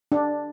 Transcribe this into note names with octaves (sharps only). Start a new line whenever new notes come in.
D4